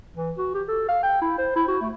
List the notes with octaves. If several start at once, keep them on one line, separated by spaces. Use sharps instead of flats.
E3
F#4
G4
A4
F5
G5
E4
C5
E4
F#4
A3